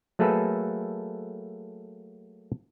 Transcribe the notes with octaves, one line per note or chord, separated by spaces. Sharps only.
F#3 A3 A#3 G#4 A4 B4